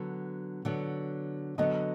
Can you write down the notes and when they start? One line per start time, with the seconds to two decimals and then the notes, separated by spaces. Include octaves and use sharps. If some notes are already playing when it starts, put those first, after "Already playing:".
Already playing: D3 F#3 B3
0.65 D3 F#3 B3
1.58 D3 F#3 B3 D#5